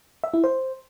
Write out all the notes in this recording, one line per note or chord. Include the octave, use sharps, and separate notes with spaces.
E5
E4
C5